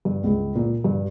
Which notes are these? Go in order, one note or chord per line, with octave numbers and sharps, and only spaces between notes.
G2
C#2
A#2
G2